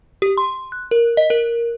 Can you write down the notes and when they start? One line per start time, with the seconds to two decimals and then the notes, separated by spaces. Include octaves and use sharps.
0.22 G4
0.37 C6
0.72 F#6
0.91 A#4
1.17 D#5
1.30 A#4